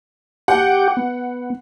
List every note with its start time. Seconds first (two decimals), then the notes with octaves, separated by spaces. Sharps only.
0.48 G4 F#5 G5 D6
0.97 B3